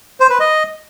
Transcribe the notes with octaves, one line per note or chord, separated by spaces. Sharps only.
C5
B4
D#5